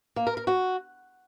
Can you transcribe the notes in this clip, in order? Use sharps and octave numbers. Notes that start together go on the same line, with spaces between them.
A#3
A#4
A#4
F#4